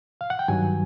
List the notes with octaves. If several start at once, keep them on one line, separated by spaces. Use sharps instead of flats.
F5
F#5
G5
G2 D#3 F#3 G#5